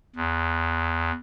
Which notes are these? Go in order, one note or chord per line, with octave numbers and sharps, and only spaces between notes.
E2